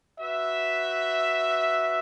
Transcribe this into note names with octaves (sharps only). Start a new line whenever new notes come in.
F#4 B4 E5